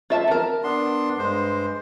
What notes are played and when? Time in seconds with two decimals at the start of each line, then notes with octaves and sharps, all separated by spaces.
0.10 F4 E5 A5
0.28 A#4 A5
0.64 B3 D4 C6
1.18 G2 G#3 C5